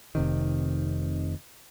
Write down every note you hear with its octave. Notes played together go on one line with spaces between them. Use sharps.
F1 C3 D#3